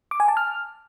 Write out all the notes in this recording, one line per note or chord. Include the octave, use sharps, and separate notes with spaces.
D6
G#5
A5
F6